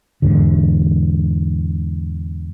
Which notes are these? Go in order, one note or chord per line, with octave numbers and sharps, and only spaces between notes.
E2 G#2 D3